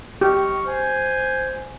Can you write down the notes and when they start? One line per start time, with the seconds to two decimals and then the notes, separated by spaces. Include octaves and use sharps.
0.21 G4 D#5 C#6 F6
0.66 C5 G#5